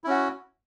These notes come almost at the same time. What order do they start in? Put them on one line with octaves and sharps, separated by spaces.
E4 C#4 F#4